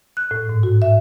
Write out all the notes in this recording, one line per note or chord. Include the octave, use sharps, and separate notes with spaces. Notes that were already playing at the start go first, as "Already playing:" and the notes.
F#6
A2
G#2
F#4
E5